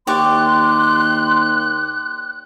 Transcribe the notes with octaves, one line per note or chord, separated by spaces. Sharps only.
D#2 G4 D5 C6 C#6 F#6